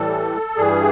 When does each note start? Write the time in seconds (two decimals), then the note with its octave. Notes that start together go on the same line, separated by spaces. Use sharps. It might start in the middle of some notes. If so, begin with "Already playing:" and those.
Already playing: A2 E3 G3 A4
0.56 G2 E3 G3 G#4